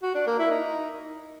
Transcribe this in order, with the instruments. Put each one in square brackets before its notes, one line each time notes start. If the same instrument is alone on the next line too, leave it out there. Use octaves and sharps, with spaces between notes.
[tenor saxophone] F#4
D4
A#3
E4
D#4